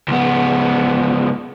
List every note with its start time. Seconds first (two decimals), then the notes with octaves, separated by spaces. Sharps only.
0.08 C#2 B3